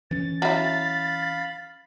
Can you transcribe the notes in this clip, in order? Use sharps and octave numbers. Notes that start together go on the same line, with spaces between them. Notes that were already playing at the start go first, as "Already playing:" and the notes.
E3 C#4 A6
F#3 E4 F5 B5